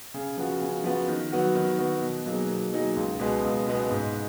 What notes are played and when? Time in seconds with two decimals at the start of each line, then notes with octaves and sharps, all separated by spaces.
0.14 C#3
0.37 F3 B3 F#4
0.61 C#3
0.84 F3 B3 F#4
1.08 D#3
1.32 F#3 B3 F#4
1.55 D#3
1.79 F#3 B3 F#4
2.02 B2
2.26 F#3 A#3 D#4 G#4
2.49 B2
2.72 F#3 A#3 D#4 G#4
2.96 C#2
3.20 B2 G#3 B3
3.43 C#2
3.67 B2 G#3 B3
3.91 G#2